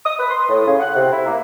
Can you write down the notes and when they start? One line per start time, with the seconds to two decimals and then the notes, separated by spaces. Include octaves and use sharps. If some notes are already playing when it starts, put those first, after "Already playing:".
0.06 D#6
0.19 B4
0.30 C6
0.49 A2
0.66 C#3
0.80 F#5
0.95 C3
1.12 E4
1.26 A#3